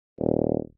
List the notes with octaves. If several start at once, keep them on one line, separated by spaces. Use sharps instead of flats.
D#1